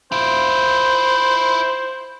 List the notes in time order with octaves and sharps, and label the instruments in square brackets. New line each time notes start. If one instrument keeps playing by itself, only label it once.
[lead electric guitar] E4 F4 [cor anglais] C5